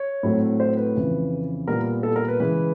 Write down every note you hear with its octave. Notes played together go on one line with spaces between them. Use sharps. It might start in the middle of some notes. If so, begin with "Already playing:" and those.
Already playing: C#5
A2 F#3 A3 C4
C5
B4
F2 C#3 E3
A#2 G3 B3 A#4
A4
A#4
B4
C#3 E3 G#3 B4